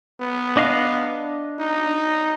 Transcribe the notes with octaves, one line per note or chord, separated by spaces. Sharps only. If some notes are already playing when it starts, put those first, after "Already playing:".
B3
D4 D#5 F5
D#4